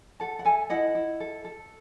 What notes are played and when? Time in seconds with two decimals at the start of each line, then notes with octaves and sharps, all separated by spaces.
0.20 A4 F#5 A5
0.39 F#5
0.45 A4 E5 G#5
0.70 E4 D#5 F#5
0.95 E4
1.20 A4
1.45 A4